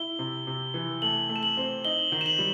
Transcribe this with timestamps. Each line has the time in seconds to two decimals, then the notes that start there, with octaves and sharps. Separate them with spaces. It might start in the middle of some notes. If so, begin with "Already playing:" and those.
Already playing: E4 G7
0.19 C3
0.47 C3
0.74 E3
1.02 A3 F#7
1.29 A3
1.36 E7
1.43 F#7
1.57 C4
1.85 D#4 G7
2.12 D#3
2.21 E7
2.26 F#7
2.39 G3